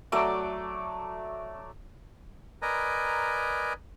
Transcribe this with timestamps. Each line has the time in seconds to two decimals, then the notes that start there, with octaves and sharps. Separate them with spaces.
0.12 F#3 A3 D5 D6
2.62 A#4 B4 D5 D#5 G#5 A#5